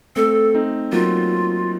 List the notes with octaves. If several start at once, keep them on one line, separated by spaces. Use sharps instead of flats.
A3 C4 A4
C4 D#4
F#3 A#3 F4